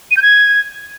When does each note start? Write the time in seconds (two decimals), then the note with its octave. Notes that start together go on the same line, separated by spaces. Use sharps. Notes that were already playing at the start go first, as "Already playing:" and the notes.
0.11 D#7
0.17 G6
0.22 G#6